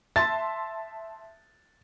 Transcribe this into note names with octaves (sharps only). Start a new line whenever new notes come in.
E5 A5 C6 A6